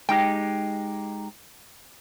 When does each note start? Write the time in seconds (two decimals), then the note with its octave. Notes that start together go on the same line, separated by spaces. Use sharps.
0.09 G#3 D#4 G4 G5